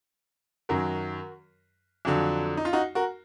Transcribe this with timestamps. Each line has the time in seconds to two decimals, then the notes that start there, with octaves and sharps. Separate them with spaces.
0.69 F#2 D#3 F#3 F#4 A#4
2.05 F2 D3 F#3
2.57 D#4
2.65 F4
2.73 D#4 F#4
2.95 F#4 A#4